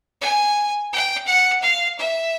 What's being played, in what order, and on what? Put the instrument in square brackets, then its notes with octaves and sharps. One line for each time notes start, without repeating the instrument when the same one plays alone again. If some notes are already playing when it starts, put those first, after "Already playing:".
[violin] G#5
G5
F#5
F5
E5